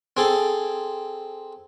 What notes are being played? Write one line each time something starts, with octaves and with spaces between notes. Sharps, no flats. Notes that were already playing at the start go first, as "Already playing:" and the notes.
C4 G#4 A4